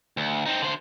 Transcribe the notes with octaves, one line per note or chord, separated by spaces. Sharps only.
D2
C4 D#4
D3 C5